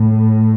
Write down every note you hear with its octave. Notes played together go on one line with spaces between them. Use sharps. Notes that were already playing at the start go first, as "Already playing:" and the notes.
Already playing: A2